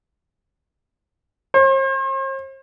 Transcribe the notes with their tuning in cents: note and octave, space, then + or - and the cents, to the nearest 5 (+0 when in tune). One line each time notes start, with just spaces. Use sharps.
C5 +45